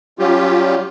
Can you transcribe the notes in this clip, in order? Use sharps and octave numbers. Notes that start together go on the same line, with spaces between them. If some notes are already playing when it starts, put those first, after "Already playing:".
F#3 G3 C#4 F4 G4